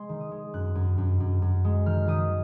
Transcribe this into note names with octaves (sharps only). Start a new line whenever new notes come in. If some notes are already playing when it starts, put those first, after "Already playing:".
Already playing: G#3 C6
D#3
D#6
G#3
F#2 F#6
F#2
F#2
F#2
F#2
G#3
D#3 F6
D#3 D#6